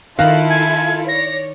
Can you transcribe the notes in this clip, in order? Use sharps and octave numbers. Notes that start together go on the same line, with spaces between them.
D#3 E4 F4 A4 F5 F#6
G#5
C#5 D5 A#6